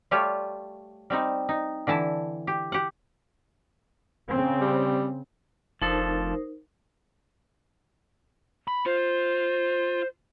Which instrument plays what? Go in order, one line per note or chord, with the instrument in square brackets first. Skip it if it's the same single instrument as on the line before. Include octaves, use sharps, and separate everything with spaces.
[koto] G3 A3 F4 G4 C#5
G3 C4 D#4
D#4
D3 E3 E4 A5
G4
G4 F#5
[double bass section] C#3 C4
[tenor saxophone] G3
[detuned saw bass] F1 [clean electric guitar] F3 D4 A4 [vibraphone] D#4 A#4 C5
[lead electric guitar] B5
[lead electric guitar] F4 [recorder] C5